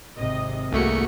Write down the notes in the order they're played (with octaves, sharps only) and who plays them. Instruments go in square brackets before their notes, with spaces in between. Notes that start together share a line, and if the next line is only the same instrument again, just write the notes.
[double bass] G#1 C3 [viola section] D#5
[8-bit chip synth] C2 A3 C#7 [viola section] A#3 F#4 G#4